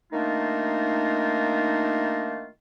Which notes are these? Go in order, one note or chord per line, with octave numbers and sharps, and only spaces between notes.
D#3 A3 A#3 D4 D#4 F4